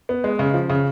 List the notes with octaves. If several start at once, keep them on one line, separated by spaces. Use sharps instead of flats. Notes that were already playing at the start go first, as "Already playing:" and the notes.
B3
G#3
C#3
F3
C#3